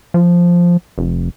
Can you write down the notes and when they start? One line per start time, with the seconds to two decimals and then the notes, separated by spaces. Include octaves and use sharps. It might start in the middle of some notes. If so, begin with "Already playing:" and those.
0.14 F3
0.98 F1